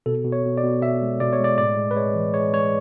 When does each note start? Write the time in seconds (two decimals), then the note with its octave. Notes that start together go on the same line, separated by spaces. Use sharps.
0.06 B2 A4
0.25 B2
0.32 C#5
0.45 B2
0.58 D5
0.63 B2
0.82 B2 E5
1.02 G#3
1.20 B2 D5
1.33 C#5
1.39 G#3 D5
1.58 A2 D5
1.77 G#3
1.91 B4
1.96 G#3 C#5
2.15 E3
2.34 G#3 C#5
2.54 G#3 C#5